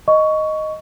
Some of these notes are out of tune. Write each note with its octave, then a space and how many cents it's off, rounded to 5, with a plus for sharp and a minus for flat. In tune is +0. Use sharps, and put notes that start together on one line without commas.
D#5 +0 C#6 +15